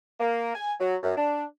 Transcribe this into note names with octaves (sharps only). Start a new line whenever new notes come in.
A#3
G#5
F#3
F#2
D4